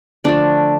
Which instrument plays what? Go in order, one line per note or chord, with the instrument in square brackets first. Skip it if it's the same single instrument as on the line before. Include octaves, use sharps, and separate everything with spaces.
[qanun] D3 F3 A3 D4 D5